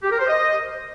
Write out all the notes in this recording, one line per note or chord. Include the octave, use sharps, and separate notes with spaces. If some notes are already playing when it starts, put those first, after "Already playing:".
G4
A#4
C5
D#5